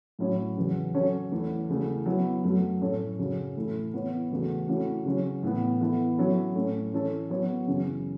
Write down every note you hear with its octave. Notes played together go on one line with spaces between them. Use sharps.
A2 F#3 C#4 E4 C#5
E2 C#3 F#3
F#3 C#4 A4 C#5
E2 E3 A3
E2 C#3 E3 A3
F#3 B3 E4
F#2 F#3 A3
A2 A3 C#4 A4 C#5
F#2 C#3 F#3 C#4
A2 E3 A3 E4 A4
E3 B3 E4 C#5
E2 C#3 A3 F#4
E3 A3 C#4 F#4
C#3 F#3 C#4
A2 E3 B3
E3 B3 E4 A4
F#3 C#4 E4 A4
A2 A3 C#4
E3 C#4 A4
F#3 B3 F#4 C#5
F#2 C#3 E3 C#4